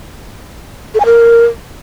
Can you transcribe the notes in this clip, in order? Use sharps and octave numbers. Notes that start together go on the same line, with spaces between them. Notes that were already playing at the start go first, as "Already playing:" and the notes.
A4
G#5
A#4